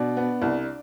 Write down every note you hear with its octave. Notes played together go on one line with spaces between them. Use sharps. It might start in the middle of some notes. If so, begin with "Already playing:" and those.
Already playing: B2 D4 D5
B3
C2